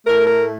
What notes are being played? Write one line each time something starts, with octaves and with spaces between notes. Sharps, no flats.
A2 A3 A#4
A#4